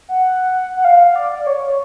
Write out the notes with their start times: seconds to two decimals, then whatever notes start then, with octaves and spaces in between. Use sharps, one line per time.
0.09 F#5
0.77 F#5
0.85 F5
1.16 D5
1.31 D5
1.47 C#5